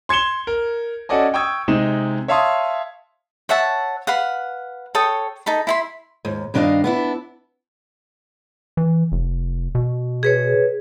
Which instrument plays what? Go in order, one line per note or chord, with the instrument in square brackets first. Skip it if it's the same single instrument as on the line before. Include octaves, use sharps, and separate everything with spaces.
[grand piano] C6 G#6 C#7 E7 G7
A#4
C#4 F#4 A4 D5 D#5 G#5
G5 C#6 D#6 E6 G#6
C3 G#3 D#4 E7
C#5 E5 F5 A5 C6 D#6
[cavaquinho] C#5 E5 F#5 A5
B4 F5 F#5
A4 C#5 G5 D#6
D#4 A4 B5
E4 B5 C6
[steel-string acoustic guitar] D#2 G#2
G2 D#3 D4 B4 D#5 F5
B3 D4 E4
[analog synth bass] E3
F1
B2
[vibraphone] G#4 B4 C#5